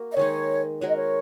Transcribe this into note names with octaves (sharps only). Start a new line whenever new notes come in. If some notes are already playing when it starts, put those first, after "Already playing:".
Already playing: A#3 F#4 A#4
D#5
D#3 G#3 D#4 C#5
G#3 F#4 A#4 C#5
D#5
C#5